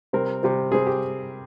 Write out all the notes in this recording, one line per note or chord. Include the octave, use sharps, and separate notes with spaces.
C3 G3 C4 A#4
C3 G3 C4
C3 G3 C4 G#4
G4